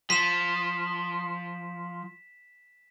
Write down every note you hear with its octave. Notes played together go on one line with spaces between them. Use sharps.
F3 B6 E7